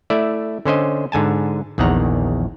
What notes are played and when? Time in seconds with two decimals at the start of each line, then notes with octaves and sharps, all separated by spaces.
0.10 A3 E4 D5 E5
0.65 D3 C#4 C5 D#5
1.12 G#2 D3 G#5 A5
1.78 A#1 E2 D#3 F#5 A#5